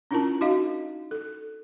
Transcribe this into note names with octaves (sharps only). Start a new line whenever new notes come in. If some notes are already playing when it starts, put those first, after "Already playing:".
C#4 D4 E4 F4 A#4 A5
D#4 F#4 D#5 F5
A4